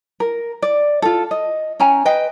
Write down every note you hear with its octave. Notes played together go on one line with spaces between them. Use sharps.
A#4
D5
F4 A4
D#5
C#4 G5 G#5 A#5
B4 D#5 G5